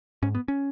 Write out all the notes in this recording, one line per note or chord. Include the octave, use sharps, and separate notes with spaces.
G#2 C#4
B3
C#4